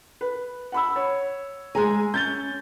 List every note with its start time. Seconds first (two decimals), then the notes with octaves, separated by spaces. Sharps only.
0.21 B4
0.72 F#5 B5 E6
0.96 C#5
1.75 G#3 G#4 G#5 A#5
2.14 C#4 G6 A6 G7